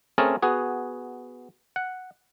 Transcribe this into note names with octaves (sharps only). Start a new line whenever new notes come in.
A3 C4 C#4 G#4 A#4 A5
B3 F#4 G#4
F#5